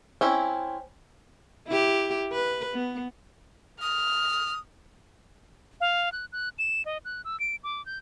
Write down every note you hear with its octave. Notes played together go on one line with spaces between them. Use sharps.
C4 C#4 E4
E4 G4
B4
B3
D#6 F6
F5
F#6
F#6
E7
D#5
F#6
E6
D7
D6
G6